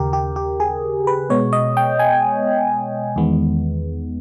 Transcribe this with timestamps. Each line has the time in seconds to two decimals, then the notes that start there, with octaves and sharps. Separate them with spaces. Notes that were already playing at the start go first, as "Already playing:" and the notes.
Already playing: D#2 C#3 G4 A#4
0.13 G4
0.36 G4
0.60 G#4
1.07 B4
1.30 B2 G#3 B3 C#5
1.53 D#5
1.77 G5
1.99 G#5
3.16 E2 D#3 G#3 B3